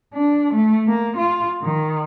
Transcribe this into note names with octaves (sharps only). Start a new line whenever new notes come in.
D4
A3
A#3
F4
D#3